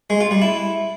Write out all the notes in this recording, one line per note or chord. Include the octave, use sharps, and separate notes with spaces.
G#3
F4
G3
E4